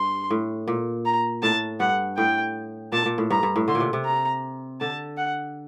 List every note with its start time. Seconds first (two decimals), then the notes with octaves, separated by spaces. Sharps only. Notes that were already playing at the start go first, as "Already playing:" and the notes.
Already playing: G2 C6
0.30 A2
0.68 A#2
1.05 A#5
1.43 A2 A5
1.80 G2 F#5
2.17 A2 G5
2.92 A#2 A5
3.06 A#2
3.18 A2
3.30 G2 A#5
3.43 G2
3.56 A2
3.68 D3 C6
3.75 A#2
3.80 C3
3.93 C3
4.05 A#5
4.80 D3 A5
5.17 F#5